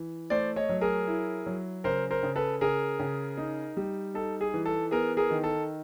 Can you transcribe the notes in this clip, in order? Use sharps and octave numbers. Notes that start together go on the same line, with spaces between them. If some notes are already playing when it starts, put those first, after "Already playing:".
Already playing: E3
A3 C5 D5
C#5 D#5
F#3
G#4 A#4
E4
F#3
C#3 A#4 C5
A#4 C5
C#3
A4 B4
C#3 G#4 A#4
C#3
D#4
G3
D#4 A4
G#4
E3
A4
B3 G#4 A#4
G#4 A#4
D#3
A4